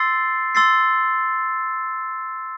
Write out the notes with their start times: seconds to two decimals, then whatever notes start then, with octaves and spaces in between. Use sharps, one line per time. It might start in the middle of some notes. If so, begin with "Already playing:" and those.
Already playing: C6 E6 A6 C7
0.55 C6 E6 A6 C7